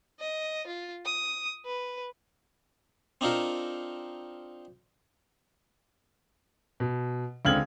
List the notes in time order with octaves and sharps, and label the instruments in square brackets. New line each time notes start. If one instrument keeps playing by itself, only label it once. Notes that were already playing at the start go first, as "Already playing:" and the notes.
[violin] D#5
F4
D#6
B4
[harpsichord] C4 D4 D#4 F4 A4 A#4
[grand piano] B2
C#2 D3 C4 F6 G#6 F#7